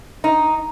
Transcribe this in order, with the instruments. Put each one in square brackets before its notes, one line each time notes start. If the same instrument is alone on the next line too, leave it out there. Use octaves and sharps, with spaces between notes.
[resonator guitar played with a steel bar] D#4